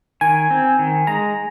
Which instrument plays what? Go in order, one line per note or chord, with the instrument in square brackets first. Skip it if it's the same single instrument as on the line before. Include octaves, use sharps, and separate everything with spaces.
[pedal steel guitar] D#3 [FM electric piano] G#5
[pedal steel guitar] C4
D#3
[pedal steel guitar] G#3 [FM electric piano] A#5